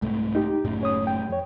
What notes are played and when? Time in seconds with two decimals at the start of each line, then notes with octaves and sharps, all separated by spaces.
0.02 C2 G#2 A3
0.35 D#4 G4
0.65 F#1 A2 C#3
0.81 C#4 C#5 D#6
1.07 G5
1.29 F2 C#5